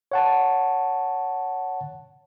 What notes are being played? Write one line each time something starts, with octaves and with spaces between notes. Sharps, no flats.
C#5 F#5 A5